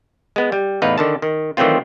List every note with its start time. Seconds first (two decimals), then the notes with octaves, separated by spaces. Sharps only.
0.36 G#3 B3
0.52 G3
0.82 E2 A2 D#4 B4 F5
0.98 D3 D#3 A5
1.22 D#3
1.57 D#3 E3 F#3 A3 C4 F4